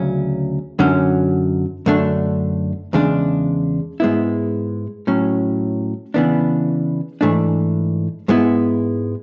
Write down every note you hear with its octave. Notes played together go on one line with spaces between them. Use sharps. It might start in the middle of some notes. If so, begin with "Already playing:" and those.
Already playing: D2 C#3 F#3 C#4
F#2 D3 F#3 C#4
F#2 D3 A3 D4
E2 C#3 G#3 D4
G#2 G#3 B3 E4
A2 F#3 C#4
C#3 E3 B3 D4
G#2 E3 A3 D4
G#2 G#3 B3 E4